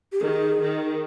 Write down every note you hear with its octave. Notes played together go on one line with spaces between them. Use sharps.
G4
D#3 G#4
D#3